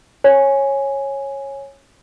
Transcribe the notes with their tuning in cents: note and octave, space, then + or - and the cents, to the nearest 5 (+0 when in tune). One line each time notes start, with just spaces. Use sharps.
C#5 -15 G#5 +0